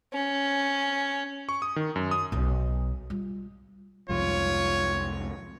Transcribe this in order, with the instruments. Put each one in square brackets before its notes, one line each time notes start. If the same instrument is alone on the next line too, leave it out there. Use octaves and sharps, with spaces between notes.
[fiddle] C#4
[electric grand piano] C#6
D#6
D#3
F#2
D#6
[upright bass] B1
G3 F4
[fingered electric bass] C2 F2 G#2 [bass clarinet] F4 [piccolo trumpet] C#5